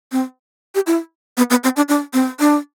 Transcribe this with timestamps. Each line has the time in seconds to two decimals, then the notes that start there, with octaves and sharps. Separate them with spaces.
0.12 C4
0.75 G4
0.87 E4
1.37 B3
1.50 B3
1.64 C4
1.76 D4
1.89 D4
2.13 C4
2.40 D4